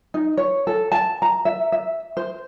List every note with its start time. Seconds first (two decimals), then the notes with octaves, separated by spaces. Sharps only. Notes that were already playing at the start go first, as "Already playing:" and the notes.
0.14 D#4
0.37 C#5
0.67 A4
0.92 A5
1.22 A#5
1.45 E5
1.72 E5
2.17 C5